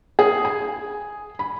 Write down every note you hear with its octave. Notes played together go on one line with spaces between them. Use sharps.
G#4
G#5
B5